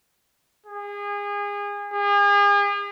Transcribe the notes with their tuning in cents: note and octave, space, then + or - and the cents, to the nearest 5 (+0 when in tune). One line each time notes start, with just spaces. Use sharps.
G#4 -30
G#4 -40